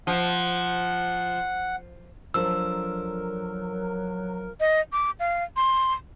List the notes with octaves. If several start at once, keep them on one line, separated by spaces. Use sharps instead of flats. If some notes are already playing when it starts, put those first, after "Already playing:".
F3 F#5
F3 F#3 D4 A4 A#4 E6
D#5
D6
F5
C6